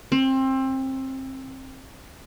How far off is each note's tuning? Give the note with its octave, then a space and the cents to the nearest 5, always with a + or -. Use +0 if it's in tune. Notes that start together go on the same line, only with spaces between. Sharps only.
C4 +25